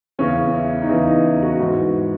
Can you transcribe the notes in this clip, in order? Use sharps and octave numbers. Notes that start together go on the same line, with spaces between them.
E2 C#3 E3 C#4
E4
D#4
E2 C#3 E3 E4
D#4
E4
F#4
G#2 E3 F#4